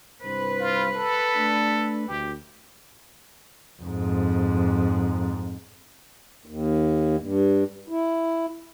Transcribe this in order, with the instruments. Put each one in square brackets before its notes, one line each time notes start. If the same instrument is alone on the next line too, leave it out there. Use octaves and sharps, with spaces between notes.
[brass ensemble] C2 G2 C5 [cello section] B4
[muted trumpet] F4
A4
[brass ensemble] A3 D4
[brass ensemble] D2 [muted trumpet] G4
[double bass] F2 G#2
[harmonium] D#2
G2
E4